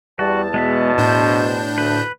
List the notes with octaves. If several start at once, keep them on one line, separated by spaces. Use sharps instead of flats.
E2 G3 F#4 A5
B2 G#3 B3 E5
A2 D4 C5 G6
D2 B4